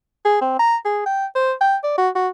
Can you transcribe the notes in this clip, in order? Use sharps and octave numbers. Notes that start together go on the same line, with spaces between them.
G#4
C4
A#5
G#4
G5
C5
G5
D5
F#4
F#4